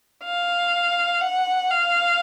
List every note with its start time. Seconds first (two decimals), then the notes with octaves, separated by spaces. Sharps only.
0.24 F5
1.22 F#5
1.70 F5